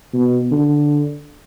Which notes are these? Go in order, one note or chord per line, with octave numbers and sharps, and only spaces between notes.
B2
D3